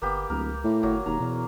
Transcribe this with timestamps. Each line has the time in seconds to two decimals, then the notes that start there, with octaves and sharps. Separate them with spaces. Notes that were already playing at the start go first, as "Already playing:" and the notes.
0.02 G1 A#3 B3 G4
0.30 D1 C#2 A#4
0.64 A2
0.83 G1 F#3 A#3
1.06 E1 D#2 A#5
1.20 E2 B2